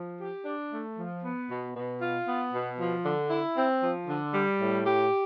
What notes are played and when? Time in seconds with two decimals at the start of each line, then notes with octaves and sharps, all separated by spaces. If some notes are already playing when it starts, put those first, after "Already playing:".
Already playing: F3
0.19 G4
0.45 D4
0.71 A3
0.97 F3
1.23 B3
1.49 B2
1.75 B2
2.00 F4
2.26 B3
2.52 B2
2.79 F3
3.05 D3
3.30 E4
3.57 C4
3.83 F3
4.07 D3
4.33 G3
4.60 A2
4.85 G4